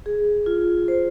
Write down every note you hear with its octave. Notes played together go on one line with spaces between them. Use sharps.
G#4
F4
C5